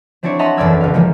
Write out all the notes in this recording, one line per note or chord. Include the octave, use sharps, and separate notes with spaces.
F#3 C4 D4 E4 C#5
D#5 E5 F#5 A5 A#5 C6
E1 B1 F#2 D5 E6 G#6
F#1 F5
D#3 F3 G#3 A#3